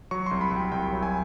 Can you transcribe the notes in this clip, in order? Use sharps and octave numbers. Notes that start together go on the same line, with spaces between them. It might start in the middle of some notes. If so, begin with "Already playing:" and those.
F#3 C#6
C2 C6
B5
C2 G5
C2 G5
F#3
G#5